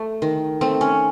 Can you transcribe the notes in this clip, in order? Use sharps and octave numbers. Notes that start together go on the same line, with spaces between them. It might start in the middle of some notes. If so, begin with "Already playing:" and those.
Already playing: A3
D#3
A3 C4
C#4